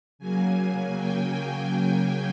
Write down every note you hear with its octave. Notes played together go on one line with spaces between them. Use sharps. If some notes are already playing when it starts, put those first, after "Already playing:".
C#3 F#3 A#3 G#5
G5